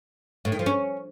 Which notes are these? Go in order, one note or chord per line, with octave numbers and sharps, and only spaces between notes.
A2
D#3
F3
C#4